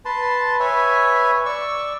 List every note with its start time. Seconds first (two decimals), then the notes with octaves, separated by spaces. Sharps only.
0.05 B4 A5 C6
0.60 B4 C#5 E5 G#5
1.45 D5 C#6 E6